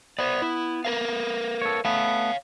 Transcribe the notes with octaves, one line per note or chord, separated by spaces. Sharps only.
B3 C5 D5
E4
A#4 B4 F5
A4 C#5
A3 B3 C#5 F5